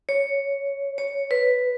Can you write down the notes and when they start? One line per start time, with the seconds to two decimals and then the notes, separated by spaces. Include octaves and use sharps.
0.09 C#5
0.98 C#5
1.31 B4